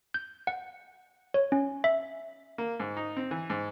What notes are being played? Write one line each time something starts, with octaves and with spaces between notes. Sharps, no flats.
G6
F#5
C#5
C#4
E5
A#3
G#2
D#4
C4
E3
G#2